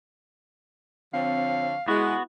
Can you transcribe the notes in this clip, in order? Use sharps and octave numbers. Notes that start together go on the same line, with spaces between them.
D3 F3 C4 C#5 F5
G#3 B3 E4 F#4